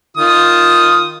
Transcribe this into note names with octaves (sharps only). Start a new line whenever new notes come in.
D#3 F4 D#6